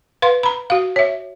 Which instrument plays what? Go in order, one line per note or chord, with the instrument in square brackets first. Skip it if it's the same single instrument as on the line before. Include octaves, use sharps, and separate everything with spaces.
[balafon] B4 F5 C6
A#5 B5
F#4 F5
C#5 E5